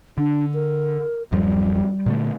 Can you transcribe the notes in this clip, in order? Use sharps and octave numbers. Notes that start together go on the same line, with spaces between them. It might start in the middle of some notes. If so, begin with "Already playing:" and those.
D3 D4
A#4
D1 F#2 F3 G3
A#2 D3 A3